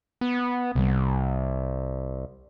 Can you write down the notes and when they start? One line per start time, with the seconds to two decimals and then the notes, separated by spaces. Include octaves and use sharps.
0.21 B3
0.75 C2 C3 G3